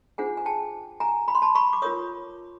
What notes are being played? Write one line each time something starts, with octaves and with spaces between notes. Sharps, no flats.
D4 F4 G#4 C5 F#5 G#5
G#5
G5 A5
G#5 A#5
B5
C6
A5 B5
B5 C#6
D6
F4 A#4 C#5 C#6 D#6